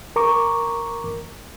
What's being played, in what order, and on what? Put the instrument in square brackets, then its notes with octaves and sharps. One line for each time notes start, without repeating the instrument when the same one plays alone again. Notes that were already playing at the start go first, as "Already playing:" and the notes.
[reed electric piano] A#4 A#5 C#6 D6